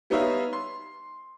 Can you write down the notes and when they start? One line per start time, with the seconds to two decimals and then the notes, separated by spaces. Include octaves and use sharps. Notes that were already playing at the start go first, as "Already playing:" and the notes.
0.10 G3 B3 D#4 C#5 E5 F5
0.53 C6